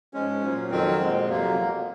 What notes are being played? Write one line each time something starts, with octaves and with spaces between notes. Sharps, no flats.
G#2 F3 G#3 C#4
A#2 F#3
F2 D#3 F#3 C4
A#2 G#3
F2 C3 F#3 A#3